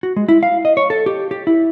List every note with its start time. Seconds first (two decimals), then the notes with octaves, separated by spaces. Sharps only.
0.03 F#4
0.16 G#3
0.29 E4
0.43 F5
0.65 D#5
0.77 C#5
0.90 A4
1.06 G4
1.31 G4
1.47 E4